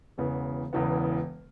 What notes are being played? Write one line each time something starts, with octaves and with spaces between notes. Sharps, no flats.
E1 E2 C#3 E3 B3
E1 E2 C#3 E3 B3